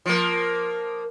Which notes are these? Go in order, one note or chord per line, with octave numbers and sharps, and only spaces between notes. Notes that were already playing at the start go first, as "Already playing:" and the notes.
F3 A#3